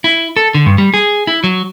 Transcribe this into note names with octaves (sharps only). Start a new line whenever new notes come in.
E4
A4
D3
G2
G3
G#4
E4
F#3